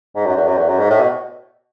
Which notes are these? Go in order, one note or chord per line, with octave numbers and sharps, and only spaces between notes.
G#2
F#2
E2
F#2
E2
F#2
G#2
A2
B2